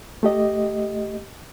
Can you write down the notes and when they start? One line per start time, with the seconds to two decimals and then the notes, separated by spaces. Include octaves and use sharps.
0.23 A3 G4 D#5